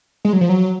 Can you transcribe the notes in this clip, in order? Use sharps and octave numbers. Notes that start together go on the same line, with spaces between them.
G#3
F#3
F3
F#3